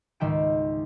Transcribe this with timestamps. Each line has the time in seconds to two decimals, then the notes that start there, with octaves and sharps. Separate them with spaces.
0.20 C#2 G#2 D#3 E5 G5 D7